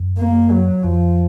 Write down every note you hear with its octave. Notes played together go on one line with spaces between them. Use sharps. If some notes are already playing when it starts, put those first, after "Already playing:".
Already playing: F#2
A#3
F#3
F2 F3